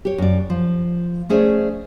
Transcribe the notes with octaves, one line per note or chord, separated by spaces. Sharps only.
G4 C#5
F#2 D5
F3
A3 C#4 G#4 C5 D5 E5